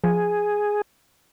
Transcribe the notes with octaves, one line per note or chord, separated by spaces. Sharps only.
F3 G#4